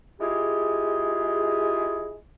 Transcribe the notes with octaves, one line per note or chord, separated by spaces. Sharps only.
G#3 E4 F4 G4 G#4